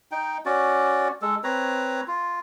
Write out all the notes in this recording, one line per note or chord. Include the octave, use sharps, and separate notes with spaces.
D#4 G5
C#4 F#4 D5
G#3 A4
C4 B4 C#5 A#5
F4